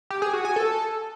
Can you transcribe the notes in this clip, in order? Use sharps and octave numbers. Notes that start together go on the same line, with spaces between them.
G4
G#4
F#4
G#5
A4